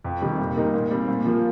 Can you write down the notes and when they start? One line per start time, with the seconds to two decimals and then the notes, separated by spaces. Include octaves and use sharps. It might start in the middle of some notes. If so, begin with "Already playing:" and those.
0.04 F2
0.22 C3 D#3 G3
0.39 A#2
0.57 G3 A#3 D#4 A#4
0.74 A#2
0.91 G3 C4
1.08 A#2
1.26 F3 A#3